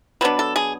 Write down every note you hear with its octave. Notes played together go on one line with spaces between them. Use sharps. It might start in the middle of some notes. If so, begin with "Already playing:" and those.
B2 F#3 B3 D4 B4
A4
G#4